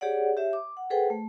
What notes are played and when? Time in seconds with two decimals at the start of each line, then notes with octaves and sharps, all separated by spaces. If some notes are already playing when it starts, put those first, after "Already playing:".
0.01 G4 G#4 C#5 D5 F#5
0.37 G4 C#5 E5
0.53 D6
0.77 F#5
0.90 G#4 A4 B4 C5 F#5 G5
1.10 A3